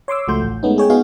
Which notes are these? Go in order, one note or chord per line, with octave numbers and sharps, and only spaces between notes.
C#5 C6 D6 E6
C#2 F3 A3 F#4 C6 G6
A1
G#3 A3 B3 C#4 D#4
G#3 G#4 C#5 G5
B3 D#4 F4 F#4 G#4 F5